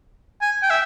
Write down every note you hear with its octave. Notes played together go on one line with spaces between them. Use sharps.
G#5
G5
E5